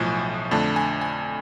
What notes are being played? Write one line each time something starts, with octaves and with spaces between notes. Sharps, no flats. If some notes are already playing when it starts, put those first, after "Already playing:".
Already playing: B1 A2 F3 G#5
F2 D3 A3 D4 A5
G#5
G#5